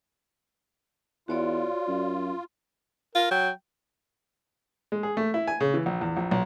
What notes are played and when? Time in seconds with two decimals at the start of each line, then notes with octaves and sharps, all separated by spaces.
1.28 E2 F4 F#4 C#5 D5
1.88 F#2
3.15 F4 A#4
3.31 F#3 G5
4.92 G#3
5.03 G#4
5.17 A3
5.34 E4
5.47 G#5
5.61 C#3
5.74 E3
5.86 A#1
6.01 E2
6.17 A#1
6.31 B1